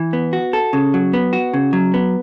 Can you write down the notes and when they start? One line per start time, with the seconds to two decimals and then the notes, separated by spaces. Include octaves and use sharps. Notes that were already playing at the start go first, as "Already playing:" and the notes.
Already playing: E3
0.13 B3
0.33 F#4
0.53 A4
0.73 C#3
0.94 F#3
1.13 B3
1.33 F#4
1.54 C#3
1.73 F#3
1.94 B3